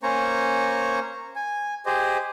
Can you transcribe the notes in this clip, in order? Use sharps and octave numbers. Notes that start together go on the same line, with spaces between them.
A#3 C#4 C5 G#5 A#5 C#6
G#5
G4 G#4 C5 D#5